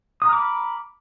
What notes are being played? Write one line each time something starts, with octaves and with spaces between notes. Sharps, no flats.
A#5 B5 D6 D#6 F6